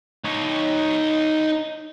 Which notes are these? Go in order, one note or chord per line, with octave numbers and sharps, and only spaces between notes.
D#4 C#5